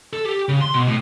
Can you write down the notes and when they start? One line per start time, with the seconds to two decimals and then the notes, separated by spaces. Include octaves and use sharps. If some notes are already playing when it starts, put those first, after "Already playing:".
0.13 A4
0.25 G4
0.49 C#3
0.61 C6
0.74 B2
0.87 A2